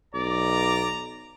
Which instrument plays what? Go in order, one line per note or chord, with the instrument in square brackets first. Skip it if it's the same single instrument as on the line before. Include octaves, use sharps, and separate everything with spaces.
[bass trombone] B1 [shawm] D5 [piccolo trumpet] A#5